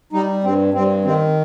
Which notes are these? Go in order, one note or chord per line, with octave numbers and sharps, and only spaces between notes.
G3 D#4
G2 C4
G2 C4
D#3 C4